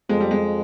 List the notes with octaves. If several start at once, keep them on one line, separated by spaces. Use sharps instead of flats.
F2 G#3
G3
G#3